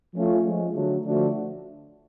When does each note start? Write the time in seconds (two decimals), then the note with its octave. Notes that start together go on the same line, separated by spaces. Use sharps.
0.14 F3 A3 C#4 F4
0.44 F3 G#3 C#4
0.74 D3 F#3 A3
1.04 D3 F3 A3 D4 F#4